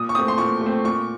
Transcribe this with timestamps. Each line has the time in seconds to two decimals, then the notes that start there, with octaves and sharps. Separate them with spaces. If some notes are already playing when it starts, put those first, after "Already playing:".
Already playing: A#2 D#6
0.09 C#6
0.15 A3 C4 D#6
0.28 C6
0.38 A#2 C#6
0.61 A3
0.66 C4
0.84 A#2 C#6